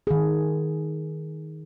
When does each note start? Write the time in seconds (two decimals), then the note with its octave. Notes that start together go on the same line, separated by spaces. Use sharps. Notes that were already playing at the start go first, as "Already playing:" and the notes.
0.07 D#3 G#4